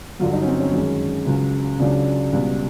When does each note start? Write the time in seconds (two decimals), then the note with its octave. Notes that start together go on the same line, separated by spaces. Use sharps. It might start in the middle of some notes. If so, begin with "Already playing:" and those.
0.19 G2 D3 F#3 F4
0.33 D#4
0.42 C#4
0.47 C4
0.60 C#4
0.73 F#2 D#3 G#3
1.26 C#2 C#3 F#3
1.80 C#2 C#3 F#3 D4
2.32 C#2 B2 G3